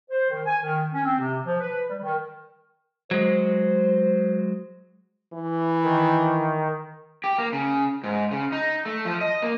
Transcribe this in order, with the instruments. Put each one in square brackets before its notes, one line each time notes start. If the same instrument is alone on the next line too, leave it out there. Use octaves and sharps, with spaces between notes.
[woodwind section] C5
D#3
G#5
D#3
C#4
C4
C3
F3
B4
G3
D#3
[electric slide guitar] F#3 G#3 [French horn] C5
[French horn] E3
[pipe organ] D#3
[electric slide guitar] G4
A#3
C#3
G#2
C#3
D#4
A3
F3
D#5
A#3